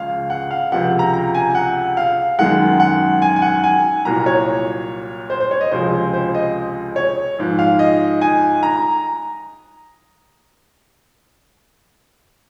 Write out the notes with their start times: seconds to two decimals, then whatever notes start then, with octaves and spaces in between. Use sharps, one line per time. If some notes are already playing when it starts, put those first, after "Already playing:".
Already playing: C#2 C#3 F3 G#3 F5
0.30 F#5
0.51 F5
0.72 C#2 C3 F3 F#5
0.99 A#5
1.13 A#5
1.35 G#5
1.55 F#5
1.97 F5
2.39 F#2 D#3 G#3 F#5
2.80 F#5
3.22 G#5
3.36 G#5
3.42 F#5
3.64 G#5
4.05 C2 A#2 F#3 A#5
4.26 C#5
5.30 C5
5.40 C5
5.51 C#5
5.61 D#5
5.71 C#2 C3 F3 G#3 C5
6.14 C5
6.35 D#5
6.96 C#5
7.38 G#2 F3 G#3
7.59 F5
7.79 D#5
8.21 G#5
8.63 A#5